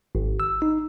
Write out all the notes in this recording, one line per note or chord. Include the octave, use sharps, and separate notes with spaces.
G#1
E6
D#4